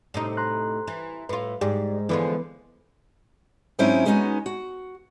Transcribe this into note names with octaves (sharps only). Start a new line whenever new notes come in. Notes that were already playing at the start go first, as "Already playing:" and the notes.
A2 C3 D#4
A#5 C6 F#6
E3
A2 F4 B4
G#2 G4 G#4 D5
D3 E3 F3 G#3 B3 B4
G#2 F#3 C4 C#4 D#4 E4
G#3 B3 C#4 D#4 F4 F#4
F#4